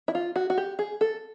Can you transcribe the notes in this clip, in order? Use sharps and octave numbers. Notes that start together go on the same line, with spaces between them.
E4
F4
F#4
F#4
G4
G#4
A4